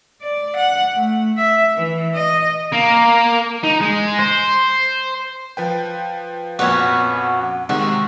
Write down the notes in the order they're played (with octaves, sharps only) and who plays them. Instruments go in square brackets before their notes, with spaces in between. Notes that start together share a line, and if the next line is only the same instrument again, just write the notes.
[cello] D5
F#5
A3
E5
E3
D#5
[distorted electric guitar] A#3
D#4
G#3
C5
[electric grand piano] F3 B4 G5
[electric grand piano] F2 A#2 G#6 [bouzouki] B3 C#4 F#4
[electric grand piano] C3 D#3 G#3 [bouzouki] F#4